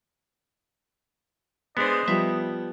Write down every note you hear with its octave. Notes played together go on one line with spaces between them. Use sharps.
G#3 B3 D4 C5 D#5
F3 G3 B3 E5